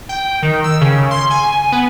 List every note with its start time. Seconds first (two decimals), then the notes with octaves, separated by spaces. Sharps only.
0.09 G5
0.43 D#3
0.64 E6
0.81 C#3
1.11 C6
1.30 G#5
1.72 B3